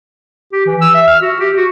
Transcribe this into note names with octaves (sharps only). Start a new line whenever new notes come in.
G4
E3
E6
E5
F6
F#4
G4
F#4